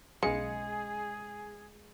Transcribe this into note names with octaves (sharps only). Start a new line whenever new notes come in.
B1 C#3 G#3 G#4 C#7